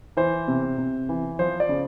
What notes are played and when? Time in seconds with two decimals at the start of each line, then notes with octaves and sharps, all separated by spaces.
0.17 E3 C5
0.48 C3
0.78 C3
1.09 E3
1.39 F3 C5
1.60 D5
1.69 C#3